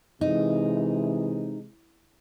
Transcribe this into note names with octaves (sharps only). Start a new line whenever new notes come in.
C3 E3 G#3 D#4